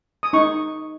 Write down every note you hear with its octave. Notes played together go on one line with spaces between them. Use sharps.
D#6
D#4 C#6